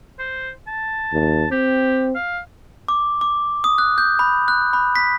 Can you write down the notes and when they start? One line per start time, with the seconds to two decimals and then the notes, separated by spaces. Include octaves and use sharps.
0.19 C5
0.68 A5
1.13 D#2
1.51 C4 G4
2.15 F5
2.88 D6
3.21 D6
3.64 D#6
3.78 F#6
3.98 G6
4.19 B5
4.48 F#6
4.73 B5
4.96 B6